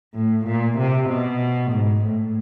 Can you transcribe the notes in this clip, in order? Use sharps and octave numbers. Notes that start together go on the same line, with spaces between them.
A2
A#2
C3
B2
G#2
A2